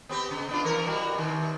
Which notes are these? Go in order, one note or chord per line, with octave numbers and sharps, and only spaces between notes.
B3 C4 G4
C#3
B3 D4 F4
G2 E3 A#4
G3 F#4
C3 D#3